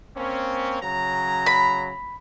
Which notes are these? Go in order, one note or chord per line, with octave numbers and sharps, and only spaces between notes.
A#3 C4 C#4
C#3 F#3 A#5
B5